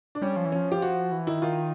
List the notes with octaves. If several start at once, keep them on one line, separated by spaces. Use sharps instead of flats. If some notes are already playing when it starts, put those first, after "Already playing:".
D4
G3 C#4
F3
E3
F3 C#4
G4
F#4
E3
D#3 E4
D#3 F4